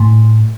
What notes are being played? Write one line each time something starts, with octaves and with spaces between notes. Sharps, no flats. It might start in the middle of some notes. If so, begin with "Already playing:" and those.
Already playing: A2